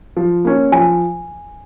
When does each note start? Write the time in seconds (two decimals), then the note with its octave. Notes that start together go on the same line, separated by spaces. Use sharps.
0.17 F3
0.45 A#3 C#4
0.72 F3 G#5